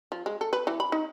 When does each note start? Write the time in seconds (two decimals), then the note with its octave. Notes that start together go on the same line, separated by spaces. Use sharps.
0.12 F3
0.26 G#3
0.41 A4
0.53 B4
0.67 E3
0.80 B5
0.92 D#4